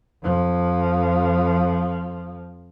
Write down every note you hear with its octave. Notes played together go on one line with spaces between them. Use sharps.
F2 F3